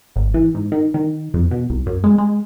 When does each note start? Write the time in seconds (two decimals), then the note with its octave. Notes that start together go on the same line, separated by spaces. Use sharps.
0.16 G#1
0.34 E3
0.55 G#2
0.72 D#3
0.94 D#3
1.34 F2
1.51 B2
1.70 C2
1.86 F#2
2.04 G#3
2.18 G#3